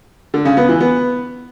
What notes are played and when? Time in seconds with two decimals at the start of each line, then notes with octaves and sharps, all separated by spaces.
0.34 D3
0.45 C#3
0.57 B3
0.69 E3
0.80 B3